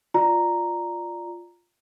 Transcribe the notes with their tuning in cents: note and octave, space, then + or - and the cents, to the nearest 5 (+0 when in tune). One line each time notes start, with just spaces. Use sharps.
F4 +0 D5 +5 A#5 +0